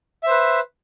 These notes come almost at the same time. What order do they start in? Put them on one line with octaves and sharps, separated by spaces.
E5 C5 B4